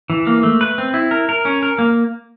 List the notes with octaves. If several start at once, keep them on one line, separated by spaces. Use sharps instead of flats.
E3
A#3
A3
B4
C4
E4
A#4
A#4
C#4
A#4
A#3